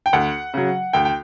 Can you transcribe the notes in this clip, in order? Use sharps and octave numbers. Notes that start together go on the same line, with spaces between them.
G5
D2 F#5
C#3 F#3
D2 G5
G5